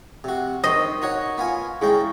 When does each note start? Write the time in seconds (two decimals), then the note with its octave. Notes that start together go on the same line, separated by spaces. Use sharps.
0.24 C3 F#4
0.64 D#3 A#4 C5 D#5 C#6 A#6
1.02 D#4 F#4 C#5
1.38 B3 F4 G#5
1.82 C#3 G#3 E4 G#4 G5 C#6